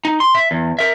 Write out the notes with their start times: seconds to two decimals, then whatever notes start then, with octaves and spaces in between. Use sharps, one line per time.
0.05 D#4
0.20 C6
0.35 E5
0.51 E2
0.79 A#4 E5